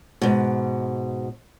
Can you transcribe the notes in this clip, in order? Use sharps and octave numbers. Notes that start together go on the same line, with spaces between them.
G#2 B2